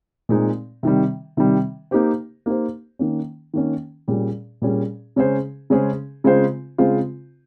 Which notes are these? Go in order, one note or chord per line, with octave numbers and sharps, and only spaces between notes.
A#2 G#3 C4 D#4
C3 D#3 G3
C3 D#3 G3
A#3 D#4 G4 C5
A#3 D#4 G4 C5
D#3 A#3 C#4
D#3 A#3 C#4
A#2 G3 C#4 G#4
A#2 G3 C#4 G#4
C#3 G#3 C#4 G#4 C5
C#3 G#3 C#4 G#4 C5
C#3 G#3 C4 F4 C5
C#3 G#3 C4 F4 C5